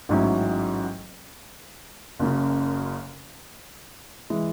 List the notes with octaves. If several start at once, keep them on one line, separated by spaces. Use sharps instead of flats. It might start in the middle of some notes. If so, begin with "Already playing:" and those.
A1 G#2 F#3 C#4 E4
F#1 F#2 C#3
E3 G#3